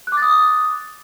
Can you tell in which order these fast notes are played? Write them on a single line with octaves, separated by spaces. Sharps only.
F#6 D6 A6 D#6